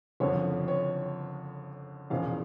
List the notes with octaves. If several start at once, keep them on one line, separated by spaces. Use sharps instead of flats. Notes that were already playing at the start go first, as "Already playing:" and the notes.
F#1 F2 D3 F3 C#5
C#5
E1 E2 C#3 F3 F5